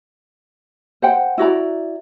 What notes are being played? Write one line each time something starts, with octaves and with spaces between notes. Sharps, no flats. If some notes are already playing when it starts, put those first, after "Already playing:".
C5 F#5 G5
E4 F#4 D5 A#5